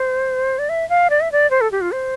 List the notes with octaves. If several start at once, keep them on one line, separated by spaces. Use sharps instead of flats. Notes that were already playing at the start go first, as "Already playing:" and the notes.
Already playing: C5
D5
E5
F5
D5
E5
D5
C5
A4
G4
F4
C5